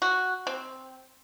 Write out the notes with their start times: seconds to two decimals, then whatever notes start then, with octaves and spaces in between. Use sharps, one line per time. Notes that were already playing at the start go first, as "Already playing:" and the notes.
0.02 F#4
0.47 C4